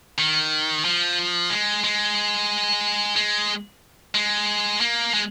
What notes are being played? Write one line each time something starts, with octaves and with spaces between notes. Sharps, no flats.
D#3
F3
G#3
G#3
G#3
G#3
A#3
G#3